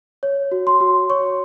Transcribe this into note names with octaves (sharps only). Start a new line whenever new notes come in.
C#5
F#4
C6
F#4
C#5 C#6